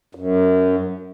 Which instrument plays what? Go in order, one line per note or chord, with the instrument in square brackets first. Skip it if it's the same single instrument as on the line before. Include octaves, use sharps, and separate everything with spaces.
[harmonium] F#2